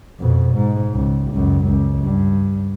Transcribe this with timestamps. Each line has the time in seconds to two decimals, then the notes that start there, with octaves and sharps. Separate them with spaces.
0.20 F2 B2
0.54 G#2
0.94 C#2
1.32 C#2 F#2
1.67 C#2
2.03 G2